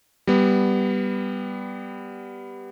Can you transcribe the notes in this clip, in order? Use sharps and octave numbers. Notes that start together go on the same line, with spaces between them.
G3 B3